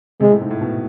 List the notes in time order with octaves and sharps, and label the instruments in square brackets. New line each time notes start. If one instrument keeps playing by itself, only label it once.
[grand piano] C3 [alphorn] G#3
[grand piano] A2
G#2
A2
B2